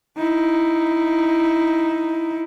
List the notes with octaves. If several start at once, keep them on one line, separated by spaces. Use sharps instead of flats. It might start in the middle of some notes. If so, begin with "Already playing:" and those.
D#4 E4